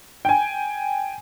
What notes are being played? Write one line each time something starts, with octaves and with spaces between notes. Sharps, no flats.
G5 G#5